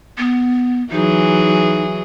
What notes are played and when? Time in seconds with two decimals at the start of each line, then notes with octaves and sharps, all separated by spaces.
0.18 B3
0.92 E3 F#3 D#4 G#4